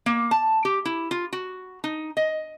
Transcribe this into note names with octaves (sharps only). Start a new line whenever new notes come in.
A#3
A5
G4
E4
F4
F#4
D#4
D#5